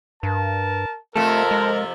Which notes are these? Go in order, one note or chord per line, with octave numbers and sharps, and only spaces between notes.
G2 A#4 A5
F2 C3 F3 A3 A4 A#4
G#3